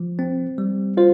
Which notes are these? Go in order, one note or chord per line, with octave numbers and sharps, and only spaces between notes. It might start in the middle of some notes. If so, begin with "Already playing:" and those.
Already playing: F3
C4
G3
F4 C5